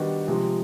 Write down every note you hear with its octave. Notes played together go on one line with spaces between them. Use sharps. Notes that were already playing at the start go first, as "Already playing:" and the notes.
Already playing: D#3 G3 B3 D4 F#4
C3 F3 G#3